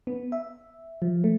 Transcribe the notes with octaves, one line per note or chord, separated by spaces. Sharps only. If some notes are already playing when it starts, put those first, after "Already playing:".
B3
E5
F3
A3